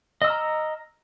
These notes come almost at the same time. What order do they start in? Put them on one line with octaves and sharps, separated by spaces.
D#5 E6 F6 A#5